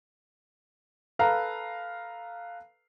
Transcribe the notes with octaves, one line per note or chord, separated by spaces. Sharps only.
A4 B4 F5 A#5